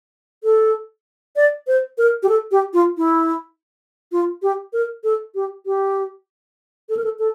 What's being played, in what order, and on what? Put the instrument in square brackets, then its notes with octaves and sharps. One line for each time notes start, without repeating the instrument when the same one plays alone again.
[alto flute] A4
D5
C5
A#4
G4
A4
G4
F4
E4
F4
G4
A#4
A4
G4
G4
A4
A#4
A4
A4